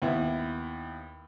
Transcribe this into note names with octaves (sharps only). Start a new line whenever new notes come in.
D#2 B3 E4